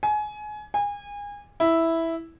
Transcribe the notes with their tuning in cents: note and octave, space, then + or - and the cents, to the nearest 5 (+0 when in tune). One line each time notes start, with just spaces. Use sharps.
G#5 +25
G#5 -30
E4 -5